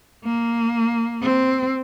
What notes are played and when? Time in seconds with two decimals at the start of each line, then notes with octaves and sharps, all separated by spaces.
0.25 A#3
1.22 C4